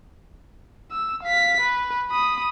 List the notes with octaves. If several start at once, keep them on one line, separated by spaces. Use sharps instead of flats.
E6
F5 B6
B4
B5 D#6